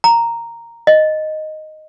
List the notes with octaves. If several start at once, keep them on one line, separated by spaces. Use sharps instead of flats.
A#5
D#5